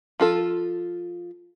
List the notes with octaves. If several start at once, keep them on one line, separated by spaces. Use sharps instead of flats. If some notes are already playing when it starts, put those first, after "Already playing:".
F3 F4 A4